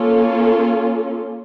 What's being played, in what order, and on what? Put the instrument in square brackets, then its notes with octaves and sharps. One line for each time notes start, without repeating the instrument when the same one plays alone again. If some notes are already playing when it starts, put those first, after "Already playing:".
Already playing: [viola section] A#3 C#4 F4 A4